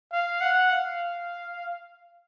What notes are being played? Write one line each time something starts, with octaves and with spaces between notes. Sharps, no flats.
F5
F#5
F5